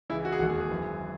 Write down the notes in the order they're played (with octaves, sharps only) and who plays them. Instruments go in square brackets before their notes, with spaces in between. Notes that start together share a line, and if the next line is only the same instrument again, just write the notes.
[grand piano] C#2 C#3 E3 E4
F#4
G#4
E1 D#2 D#3 F#4
G#4
G#4
G#1 F#2 E3